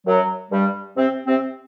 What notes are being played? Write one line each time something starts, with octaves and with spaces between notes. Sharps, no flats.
F#2 F#3
G2 G3
C3 C4
C3 C4